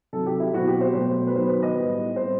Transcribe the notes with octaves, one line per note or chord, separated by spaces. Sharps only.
C3 D#3 F#3 A4
G4
E4
B2 F#3 C4 F#4
G4
C5
B2 F#3 A3 C5
B4
D#3 F#3 B3 C5
B4
D#5
A2 G3 B3
A2 G3 C4 C5